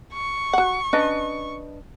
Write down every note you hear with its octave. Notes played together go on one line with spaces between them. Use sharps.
C#6
F#4 F#5
C#4 D4 B4 D#5